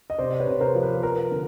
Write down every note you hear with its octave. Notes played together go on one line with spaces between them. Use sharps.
D#5
C3 C5 D5
B4 C#5
C3
A#4 C5
F3
B4
F3 A#4
D3